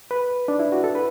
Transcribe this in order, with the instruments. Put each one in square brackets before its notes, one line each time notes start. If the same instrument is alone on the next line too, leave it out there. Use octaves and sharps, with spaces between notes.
[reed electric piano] B4
D4
E4
F#4
A4
B4